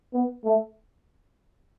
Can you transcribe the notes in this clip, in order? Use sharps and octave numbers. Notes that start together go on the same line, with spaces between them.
B3
A3